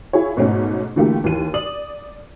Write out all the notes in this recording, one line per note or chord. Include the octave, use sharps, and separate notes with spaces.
E4 F4 G#4 C#5
G#2 B2 A3 C#4
D3 E3 A3 A#3 F4 G4
D#2 E3 D#7
D5 D#6 F#7